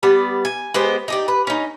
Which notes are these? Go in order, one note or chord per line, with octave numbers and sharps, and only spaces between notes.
G3 B3 D5
G#5
G#3 B3 G4 C5
D#4 G4 D5
B4
C#4 D#4